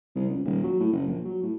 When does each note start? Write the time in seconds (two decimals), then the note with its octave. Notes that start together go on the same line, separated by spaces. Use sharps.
0.16 C2
0.29 C#2
0.45 D#1
0.64 F#3
0.80 A2
0.93 F#1
1.07 A#1
1.25 F#3
1.43 A2